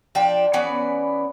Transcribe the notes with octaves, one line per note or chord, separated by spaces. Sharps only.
F3 D4 G5
E3 B3 C#4 D5